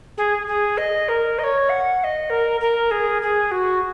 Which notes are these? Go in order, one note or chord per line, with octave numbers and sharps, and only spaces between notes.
G#4
G#4
D#5
A#4
D#5
C#5
F#5
F#5
D#5
A#4
A#4
G#4
G#4
F#4